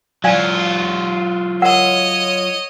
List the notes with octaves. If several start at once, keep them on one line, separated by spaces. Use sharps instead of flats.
F#3 F4 D5 F5 G#5
A#4 C#5 D#5 F#5